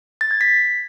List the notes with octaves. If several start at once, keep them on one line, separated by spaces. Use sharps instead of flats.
A6
G#6
B6